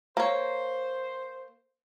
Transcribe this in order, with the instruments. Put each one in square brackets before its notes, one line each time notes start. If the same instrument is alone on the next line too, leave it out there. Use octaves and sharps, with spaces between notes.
[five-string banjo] A#3 C#5 [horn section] C5